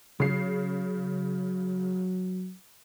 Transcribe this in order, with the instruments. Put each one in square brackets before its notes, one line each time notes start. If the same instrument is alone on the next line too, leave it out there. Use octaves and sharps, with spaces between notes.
[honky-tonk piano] C#3 C7 [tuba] F#3